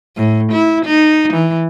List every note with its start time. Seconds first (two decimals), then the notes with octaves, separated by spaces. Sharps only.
0.16 A2
0.52 E4
0.86 D#4
1.33 E3